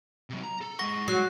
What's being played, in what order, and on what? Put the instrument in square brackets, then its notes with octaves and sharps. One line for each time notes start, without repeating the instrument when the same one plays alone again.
[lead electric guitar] C3 F#3
A#5
A4
[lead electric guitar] G#3 F#5 [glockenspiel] C#6 A#6
[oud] F#3 [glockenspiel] F#6 C7